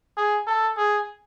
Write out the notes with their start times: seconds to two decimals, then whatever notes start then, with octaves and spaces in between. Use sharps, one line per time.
0.17 G#4
0.47 A4
0.77 G#4